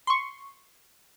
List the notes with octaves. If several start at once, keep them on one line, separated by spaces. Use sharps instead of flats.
C6 C#6